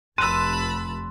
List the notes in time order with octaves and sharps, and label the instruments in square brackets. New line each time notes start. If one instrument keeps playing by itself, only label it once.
[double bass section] F1 [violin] A5 B5 [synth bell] C6 [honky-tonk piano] E6 F#6 D#7